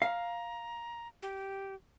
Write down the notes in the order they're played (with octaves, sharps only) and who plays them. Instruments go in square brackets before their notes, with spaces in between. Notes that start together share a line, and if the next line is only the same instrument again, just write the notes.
[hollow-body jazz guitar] F5 [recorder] A#5
[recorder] G4